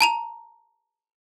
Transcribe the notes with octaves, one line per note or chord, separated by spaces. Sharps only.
A5 A#5 F7